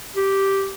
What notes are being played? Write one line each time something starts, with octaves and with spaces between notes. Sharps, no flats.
G4